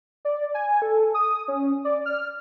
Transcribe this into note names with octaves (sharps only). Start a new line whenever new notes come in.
D5
G#5
A4
D#6
C#4
D5
F6